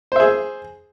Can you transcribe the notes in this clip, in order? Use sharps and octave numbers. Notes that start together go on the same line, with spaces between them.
G#4 C5 E5